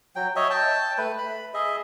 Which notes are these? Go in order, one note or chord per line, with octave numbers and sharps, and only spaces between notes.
F#3 G5
C#5 D#5 E5
G5 A5
A3 B4
B5
G#4 D#5 E5